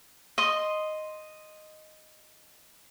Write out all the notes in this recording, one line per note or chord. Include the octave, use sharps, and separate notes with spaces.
D#5 C6